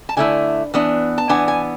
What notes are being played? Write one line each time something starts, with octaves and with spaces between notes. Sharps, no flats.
A5
D3 A3 E4 G#5
E3 B3 D4
A5
E3 B3 D4 G#5
G#5